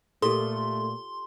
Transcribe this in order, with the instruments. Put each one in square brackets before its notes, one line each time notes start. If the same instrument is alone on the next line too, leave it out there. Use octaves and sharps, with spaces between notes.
[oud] A#2 [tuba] A3 [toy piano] G4 A4 [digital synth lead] C6